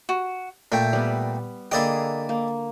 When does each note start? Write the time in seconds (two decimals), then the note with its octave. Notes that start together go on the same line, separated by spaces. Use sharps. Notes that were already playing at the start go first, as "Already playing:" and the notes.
0.09 F#4
0.72 A#2 A3 E5 G5
0.93 G3 B3
1.71 D3 A#3 E4 G#4 D5 D#5 G5
2.29 A#3